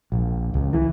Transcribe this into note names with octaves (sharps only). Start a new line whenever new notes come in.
A#1
C#2
E3